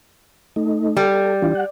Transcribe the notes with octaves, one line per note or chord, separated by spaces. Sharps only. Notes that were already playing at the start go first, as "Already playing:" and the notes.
A3 D#4
G3 A4
E3 D4 F4
F#5